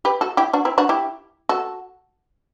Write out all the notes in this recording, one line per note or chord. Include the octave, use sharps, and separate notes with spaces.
G4 B4
F#4 A4
E4 G4
D4 F#4
C4 E4
D4 F#4
E4 G4
F#4 A4